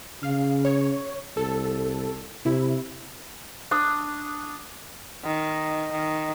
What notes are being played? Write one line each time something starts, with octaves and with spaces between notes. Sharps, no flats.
C#3 F5
C#5
C2 A4
C3 E4
D4 D#6
D#3
D#3